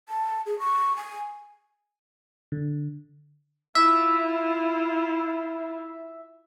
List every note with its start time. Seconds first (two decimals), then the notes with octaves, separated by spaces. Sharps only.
0.09 A5
0.46 G#4
0.59 C#6
0.97 G#5
2.52 D3
3.75 E4 F4 E5